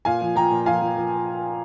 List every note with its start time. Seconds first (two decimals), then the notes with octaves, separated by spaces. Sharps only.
0.05 A#2 F5 G#5
0.21 F3
0.35 F3 G5 A#5
0.51 A#2
0.66 F3 F5 G#5
0.81 F3
0.96 F3